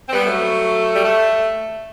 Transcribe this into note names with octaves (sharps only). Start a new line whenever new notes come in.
C4
G3 B3
F#3 A3
G3
A3